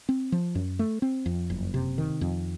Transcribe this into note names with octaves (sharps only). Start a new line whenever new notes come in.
C4
F3
F#2
A3
C4
F2
F#1
C3
D#3
F2